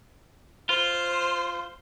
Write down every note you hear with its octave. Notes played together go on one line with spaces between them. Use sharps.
F4 C5